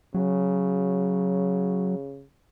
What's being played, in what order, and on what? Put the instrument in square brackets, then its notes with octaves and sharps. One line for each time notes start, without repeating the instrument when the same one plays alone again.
[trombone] C#3 [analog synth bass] F#3